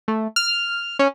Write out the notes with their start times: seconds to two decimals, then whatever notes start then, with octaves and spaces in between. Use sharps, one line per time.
0.08 A3
0.36 F6
0.99 C#4